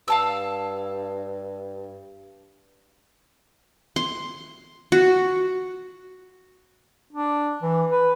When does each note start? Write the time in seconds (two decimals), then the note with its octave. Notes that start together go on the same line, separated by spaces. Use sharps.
0.08 G2 F5 A5 E6
3.96 C6
4.92 F#4
7.13 D4
7.63 E3
7.92 B4